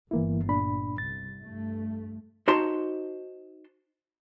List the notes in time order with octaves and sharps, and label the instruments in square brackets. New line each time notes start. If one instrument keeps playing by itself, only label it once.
[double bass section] G1 [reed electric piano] E3 A#3 E4
[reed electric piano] A#2 D4 B5
[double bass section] C2 [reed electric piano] A6
[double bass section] G2 A3
[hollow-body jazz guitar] D#4 F#4 C5 A5 A#5 C6